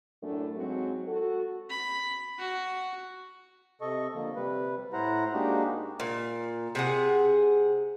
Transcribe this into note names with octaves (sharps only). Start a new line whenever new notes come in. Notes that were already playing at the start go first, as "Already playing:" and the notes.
F#2 A2 A3 D4
G#2 F#3 C4 F#4
F#4 A4
B5
F#4
C3 A4 D#5 C#6
D3 F3 A#3
C3 G3 B4
A2 E4 C5 F#5 A#5
G#3 A#3 D4 D#4 F#4 G4
A#2
C3 G#4 F#5